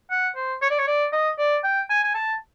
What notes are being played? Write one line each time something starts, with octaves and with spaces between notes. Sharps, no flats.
F#5
C5
C#5
D5
C#5
D5
D#5
D5
G5
G#5
G#5
A5